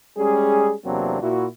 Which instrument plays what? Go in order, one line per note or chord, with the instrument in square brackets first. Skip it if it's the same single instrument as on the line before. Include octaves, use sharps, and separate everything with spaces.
[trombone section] G3 G#3 C#4 G#4
E2 C3 F#3 A#3 C4 D4
A#2 E4 F#4